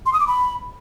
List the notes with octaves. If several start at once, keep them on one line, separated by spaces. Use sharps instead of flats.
C6
D#6
D6
B5